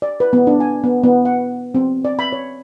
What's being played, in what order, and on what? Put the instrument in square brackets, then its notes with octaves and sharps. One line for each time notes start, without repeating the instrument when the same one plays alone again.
[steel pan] D5
B4
B3
D4
G#5
B3
B3
F#5
C4
D5
B5
C#5